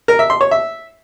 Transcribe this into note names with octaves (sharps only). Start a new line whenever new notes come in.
A#4
E5
C6
C#5
E5